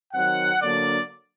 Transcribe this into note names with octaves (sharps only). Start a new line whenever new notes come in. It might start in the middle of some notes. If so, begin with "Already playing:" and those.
D#3 F#3 C4 F#5
D3 F#3 A#3 D4 D5